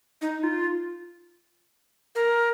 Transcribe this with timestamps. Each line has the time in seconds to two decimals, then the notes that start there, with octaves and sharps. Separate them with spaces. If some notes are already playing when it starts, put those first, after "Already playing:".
0.22 D#4
0.43 F4
2.15 A#4